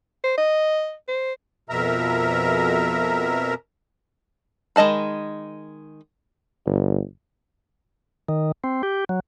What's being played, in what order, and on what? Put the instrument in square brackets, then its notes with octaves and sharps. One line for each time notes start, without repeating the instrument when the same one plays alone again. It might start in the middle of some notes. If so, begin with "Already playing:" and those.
[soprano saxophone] C5
D#5
C5
[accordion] F2 B2 A#4 E5 A#5
[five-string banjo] D#3 G#3 D#5 A5 B5
[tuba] G1
[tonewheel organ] D#3
C4
G4
F#3